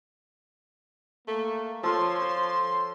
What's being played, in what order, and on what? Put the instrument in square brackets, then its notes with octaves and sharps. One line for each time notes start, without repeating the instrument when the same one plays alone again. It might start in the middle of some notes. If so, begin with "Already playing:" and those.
[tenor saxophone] A3 [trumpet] A#3
[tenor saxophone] F3 [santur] F4 A4 [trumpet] C#5 [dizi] C6
[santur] C5